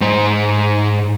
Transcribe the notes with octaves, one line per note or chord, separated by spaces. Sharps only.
G#2 C5